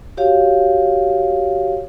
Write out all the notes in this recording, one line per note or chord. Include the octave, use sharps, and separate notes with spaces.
F#4 G4 C#5 F5